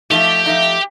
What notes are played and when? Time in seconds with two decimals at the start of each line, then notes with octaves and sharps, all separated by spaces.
0.10 F3 A3 D#4 G4
0.46 F3 A3 D#4